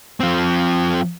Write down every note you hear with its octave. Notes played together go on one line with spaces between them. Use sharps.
F3 C4